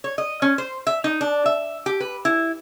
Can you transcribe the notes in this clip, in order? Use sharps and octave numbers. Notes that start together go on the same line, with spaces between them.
C#5
D#5
C#4
C5
E5
D#4
D4
E5
G4
B4
E4